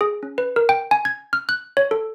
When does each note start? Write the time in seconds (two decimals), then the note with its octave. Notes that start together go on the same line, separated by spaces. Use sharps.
0.01 G#4
0.23 C#4
0.38 B4
0.56 A#4
0.69 G5
0.91 G#5
1.05 G#6
1.33 F6
1.49 F#6
1.77 C#5
1.91 A4